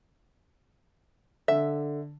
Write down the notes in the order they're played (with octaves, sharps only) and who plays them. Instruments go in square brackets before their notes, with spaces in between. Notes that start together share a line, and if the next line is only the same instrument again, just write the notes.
[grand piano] D3 [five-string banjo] E5